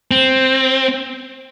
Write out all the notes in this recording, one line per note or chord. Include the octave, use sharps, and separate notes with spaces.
C4